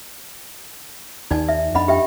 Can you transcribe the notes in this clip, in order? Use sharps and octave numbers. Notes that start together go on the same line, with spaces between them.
D#2 D#4 D5 G#5
E5
F2 D4 D#5 F#5 B5
G4 E5 G5